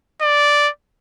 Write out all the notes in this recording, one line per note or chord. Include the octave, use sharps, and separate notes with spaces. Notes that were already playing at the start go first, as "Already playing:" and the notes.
D5